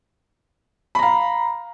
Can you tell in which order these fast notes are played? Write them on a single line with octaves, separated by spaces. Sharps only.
B5 A#5 F5